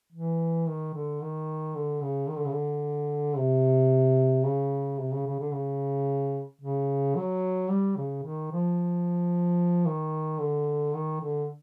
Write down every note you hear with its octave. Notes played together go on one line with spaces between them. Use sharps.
E3
D#3
D3
D#3
D3
C#3
D#3
D3
C#3
D3
C3
C#3
C3
C#3
C#3
D3
C#3
C#3
F#3
G3
C#3
D#3
F3
D#3
D3
D#3
D3